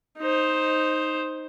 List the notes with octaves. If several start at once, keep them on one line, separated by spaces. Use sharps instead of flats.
D#4 C5